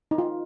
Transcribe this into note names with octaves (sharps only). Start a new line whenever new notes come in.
D#4
F4